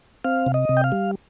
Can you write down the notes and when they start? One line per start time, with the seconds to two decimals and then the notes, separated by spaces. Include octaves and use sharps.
0.24 C4 F5
0.46 C3
0.54 D#5
0.69 C3
0.77 G5
0.84 F5
0.92 G3